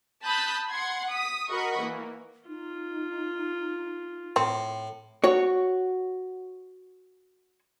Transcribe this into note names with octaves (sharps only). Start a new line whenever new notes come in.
A5 B5 D#6 F#6 G6 B6
F#5 C6 G#6
D#6 B6
F#4 A#4 D#5 F#5 B5 C#6
E3 A#3
D#4 F4
A2 C4
F#4 C#5